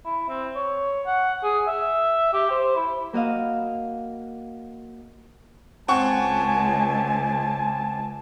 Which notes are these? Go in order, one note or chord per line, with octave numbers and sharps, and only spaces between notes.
E4
C4
C#5
F#5
G#4
E5
G4
C5
E4
A#3 F#4 D#5 F5
C#2 C4 F#5 G#5 A5 C#6